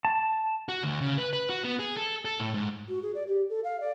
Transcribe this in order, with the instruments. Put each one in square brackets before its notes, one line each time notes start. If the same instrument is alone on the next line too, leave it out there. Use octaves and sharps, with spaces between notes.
[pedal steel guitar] A5
[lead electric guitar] F#4
D2
C#3
B4
B4
F#4
B3
G#4
A4
A4
A2
G#2
[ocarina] F#4
G#4
D5
G4
A4
F5
D5